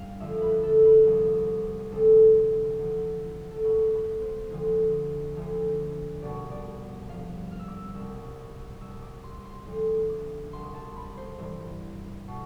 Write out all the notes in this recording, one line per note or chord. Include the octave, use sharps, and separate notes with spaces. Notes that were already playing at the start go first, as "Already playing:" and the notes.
Already playing: G2 F5 G5
F2 D3 F3 E5
B4
A4
B4
C2 C3 F3
D2 C3 F3 A4
E2 D3 F3
A4
C2 B2 B4
B4
C5
D2 D3 F3
D2 D3 F3
C2 B2 D5
D5
G2 F3 F5
F6
E6
D6
E6
C2 B2 E6
C2 B2 E6
D6
C6
C6
D2 D3 F3
D6
C2 B2 C6
A5
B5
C5
G2 E3
B2